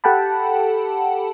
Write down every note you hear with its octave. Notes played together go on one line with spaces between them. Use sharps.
G4 A4 F#5 G5 A5 B5